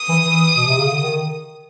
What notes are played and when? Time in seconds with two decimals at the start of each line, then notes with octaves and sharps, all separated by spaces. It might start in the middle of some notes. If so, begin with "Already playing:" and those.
Already playing: D#6
0.09 E3
0.24 E3
0.55 B2
0.67 C3
0.78 C#3
0.89 D3
1.01 D#3